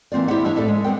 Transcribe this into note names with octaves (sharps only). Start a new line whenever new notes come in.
E3 A#3 C4 F4 D5
E4 G4 C5 D5 E5 F#5
G2 F3 D4 C#5 E5
A2 A4 D5 E5 A5
G#3
G3 B3 C4 A#4 G5